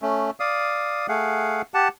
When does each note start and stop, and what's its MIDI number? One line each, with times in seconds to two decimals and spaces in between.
0.02 0.30 57
0.02 0.30 61
0.40 1.07 74
0.40 1.07 77
0.40 1.07 87
1.09 1.62 57
1.09 1.62 68
1.09 1.62 77
1.09 1.62 78
1.74 1.88 67
1.74 1.88 78
1.74 1.88 81